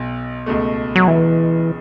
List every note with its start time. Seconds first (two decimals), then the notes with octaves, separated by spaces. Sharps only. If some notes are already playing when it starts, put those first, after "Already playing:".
Already playing: B1 B2
0.46 C#2 B2 A3
0.96 F#3
1.08 E3